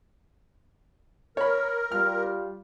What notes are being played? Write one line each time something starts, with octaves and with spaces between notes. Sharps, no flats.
A#4 C#5 B5
G3 F4 F6